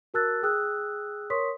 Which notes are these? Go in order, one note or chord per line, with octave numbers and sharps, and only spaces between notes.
F#4 A#4 A5 E6 F#6 A6
G#4 G5 D#6 E6 F#6
A#4 C#5 C6 C#6 D#6 B6